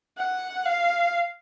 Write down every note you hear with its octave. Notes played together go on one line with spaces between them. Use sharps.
F#5
F5